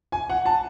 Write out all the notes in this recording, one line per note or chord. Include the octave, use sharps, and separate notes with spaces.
G#5
F#5
A5